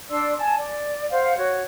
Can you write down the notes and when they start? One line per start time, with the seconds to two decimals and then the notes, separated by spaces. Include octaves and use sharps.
0.10 D4 D5 C6 E6
0.38 G#5 A5
0.57 D5
1.10 C5 F5 F#5
1.37 F#4 C#5